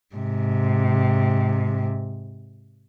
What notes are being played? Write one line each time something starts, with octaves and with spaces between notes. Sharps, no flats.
G#2 C3